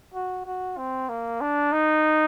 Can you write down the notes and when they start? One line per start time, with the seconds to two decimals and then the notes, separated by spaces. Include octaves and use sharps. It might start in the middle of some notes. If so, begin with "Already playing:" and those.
0.15 F#4
0.46 F#4
0.78 C4
1.09 A#3
1.41 D4
1.73 D#4